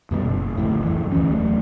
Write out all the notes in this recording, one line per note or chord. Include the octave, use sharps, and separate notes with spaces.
F#2 B2 F#3 G3
F#1
D1 A#1 A2
F#2 E3
D2 E3 C#4
E1 F#3 A3